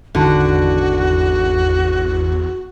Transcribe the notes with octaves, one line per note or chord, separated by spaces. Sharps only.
G#1 E2 D3 D#3 G#3 F#4